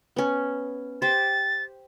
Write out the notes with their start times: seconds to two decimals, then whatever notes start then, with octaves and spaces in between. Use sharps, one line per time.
0.16 B3 C#4
1.02 G4 C5 A6